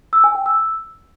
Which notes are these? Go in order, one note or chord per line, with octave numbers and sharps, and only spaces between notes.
E6
G#5
G5
E6